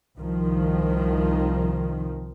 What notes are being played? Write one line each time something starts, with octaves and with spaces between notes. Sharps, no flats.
C2 D#3 F3